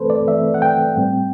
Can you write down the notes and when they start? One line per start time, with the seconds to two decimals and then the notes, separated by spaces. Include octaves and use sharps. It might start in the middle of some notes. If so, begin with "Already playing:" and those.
Already playing: E3 A3 C4 A4 B4 C5
0.10 D5
0.27 E3 A3 C4 E5
0.54 F#5
0.62 G5
0.97 A2 G3 C4